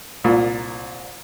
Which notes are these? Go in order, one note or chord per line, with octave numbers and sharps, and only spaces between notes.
C2 A#2